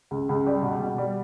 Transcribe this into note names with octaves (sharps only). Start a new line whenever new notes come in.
C#2
C#2
G3
B2
B2
G3